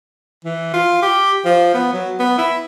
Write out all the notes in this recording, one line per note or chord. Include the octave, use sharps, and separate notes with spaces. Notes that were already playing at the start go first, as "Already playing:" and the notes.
E3
F4
G4
F3
B3
F#3
B3
E4